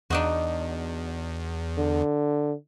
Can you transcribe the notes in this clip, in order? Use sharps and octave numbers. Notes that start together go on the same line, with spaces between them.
E2 D4 D#4 F#4
D3